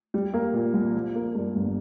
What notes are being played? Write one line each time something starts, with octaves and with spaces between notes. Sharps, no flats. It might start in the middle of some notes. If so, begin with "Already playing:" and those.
G3
A#3
A#2
C2
F3
A#3
G2
G1